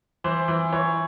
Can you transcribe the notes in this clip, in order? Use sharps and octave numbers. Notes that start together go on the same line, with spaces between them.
E3 C5
E3
E3 C#5